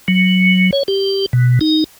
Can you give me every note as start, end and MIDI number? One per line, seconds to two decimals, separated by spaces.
0.08 0.71 54
0.73 0.83 73
0.88 1.26 67
1.33 1.59 47
1.61 1.84 63